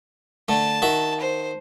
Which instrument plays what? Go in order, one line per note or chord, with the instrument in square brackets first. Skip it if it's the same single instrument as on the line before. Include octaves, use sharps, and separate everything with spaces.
[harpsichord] D3 A3 [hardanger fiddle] A5
[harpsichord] D#3 F#4 E5
[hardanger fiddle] C5